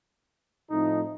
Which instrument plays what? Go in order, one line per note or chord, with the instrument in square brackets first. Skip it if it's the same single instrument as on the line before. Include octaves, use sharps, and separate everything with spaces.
[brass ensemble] A2 F3 A3 C4 D#4